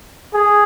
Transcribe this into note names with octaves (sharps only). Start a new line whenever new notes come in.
G#4